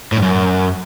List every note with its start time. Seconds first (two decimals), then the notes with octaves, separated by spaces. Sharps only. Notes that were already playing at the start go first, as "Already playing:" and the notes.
0.12 A2
0.17 G2
0.22 F#2